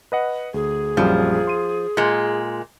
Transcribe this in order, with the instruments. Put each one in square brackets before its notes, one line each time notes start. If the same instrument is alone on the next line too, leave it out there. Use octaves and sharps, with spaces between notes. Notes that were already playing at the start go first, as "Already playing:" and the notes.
[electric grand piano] B4 D#5 F#5
[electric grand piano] D2 [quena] G#4
[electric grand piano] A#1 F#2 G3 [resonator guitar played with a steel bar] F3
[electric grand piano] C6 D#7
[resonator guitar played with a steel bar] A#2 G#3